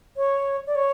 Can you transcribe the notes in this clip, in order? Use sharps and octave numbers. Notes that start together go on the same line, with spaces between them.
C#5
D5
C#5